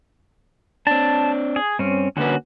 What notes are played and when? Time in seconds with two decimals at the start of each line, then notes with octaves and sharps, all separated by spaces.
0.87 C4 D4 A5
1.56 G#4
1.79 G2 C4 C#4
2.17 D3 A#3 C#4 F#4 B4